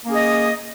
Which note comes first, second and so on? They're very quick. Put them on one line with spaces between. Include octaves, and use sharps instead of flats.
A#3 C#4 G#4 D#5